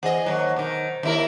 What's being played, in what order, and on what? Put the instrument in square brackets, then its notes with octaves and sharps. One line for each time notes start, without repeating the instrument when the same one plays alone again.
[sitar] E2 G#4 D#5 [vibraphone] C5 F#5
[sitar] D#2 F#3
B2 D#3
D#2 E4 A#4